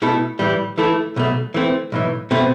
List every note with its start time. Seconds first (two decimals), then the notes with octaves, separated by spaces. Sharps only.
0.02 B2 A3 E4 A4
0.39 A2 E3 G3
0.78 E3 A3 E4 A4
1.16 B1 B2 A3
1.54 E3 A3 C4
1.92 B1 A2 E3
2.31 B2 A3 C4